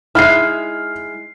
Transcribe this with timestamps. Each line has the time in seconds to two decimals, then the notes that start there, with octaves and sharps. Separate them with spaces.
0.15 G#3 D#4 E4 F6 C7